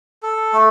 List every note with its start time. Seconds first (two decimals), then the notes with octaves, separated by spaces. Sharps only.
0.23 A4
0.53 A3